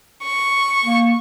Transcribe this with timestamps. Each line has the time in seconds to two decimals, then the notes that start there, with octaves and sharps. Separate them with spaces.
0.23 C#6
0.83 A#3